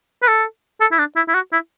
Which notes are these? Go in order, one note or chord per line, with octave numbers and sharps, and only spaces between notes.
B4
A4
A4
E4
D4
E4
E4
F#4
E4